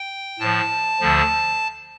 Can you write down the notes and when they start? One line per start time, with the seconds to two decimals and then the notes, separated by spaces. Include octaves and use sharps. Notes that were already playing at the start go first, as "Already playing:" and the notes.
Already playing: G5
0.39 A2 F3 A5
1.00 D2 D3 F3